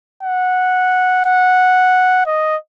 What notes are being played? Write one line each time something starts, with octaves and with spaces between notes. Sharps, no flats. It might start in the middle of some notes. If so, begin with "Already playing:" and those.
F#5
F#5
D#5